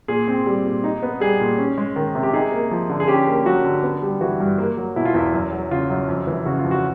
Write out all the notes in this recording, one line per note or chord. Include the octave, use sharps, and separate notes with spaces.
A#2 G#4
C4
G3
A#2
D#4
B3
G3 G#4
A#2
C#4
G#3
D#3
C3
G4
D#4 G#4
A#3
F3
D3
G#4
C#4 G4
A#3
F#3 F#4
D3
B3
G3
E3 F#4
G2
A#3
F#3
B2 E4
F4
E2 E4
F#2
F#3
C#3 F4
F#2
F2
E3
C#3 F#4
F4
F2
F#4